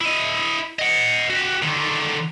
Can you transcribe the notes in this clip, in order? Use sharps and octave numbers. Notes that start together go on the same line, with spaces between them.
E4 D#5
D#5 F#5
F#4 G4
D3 D#3